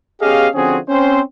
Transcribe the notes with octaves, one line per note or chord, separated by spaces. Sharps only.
B3 C#4 G4 G#4 D#5 F5
D3 F3 C4 C#4 F#4 G#4
C4 C#4 C5